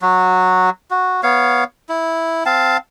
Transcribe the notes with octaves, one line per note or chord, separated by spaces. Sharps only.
F#3 F#4
F#4
B3 C#5 F5
E4
C4 F5 A5